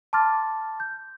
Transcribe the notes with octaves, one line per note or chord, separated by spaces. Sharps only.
A5 C6 D6 F6 A6
G6